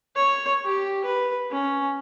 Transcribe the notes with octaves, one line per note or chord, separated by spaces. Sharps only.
C#5
G4
B4
C#4